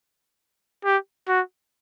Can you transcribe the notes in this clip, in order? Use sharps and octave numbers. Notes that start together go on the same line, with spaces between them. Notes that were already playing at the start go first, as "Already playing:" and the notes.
G4
F#4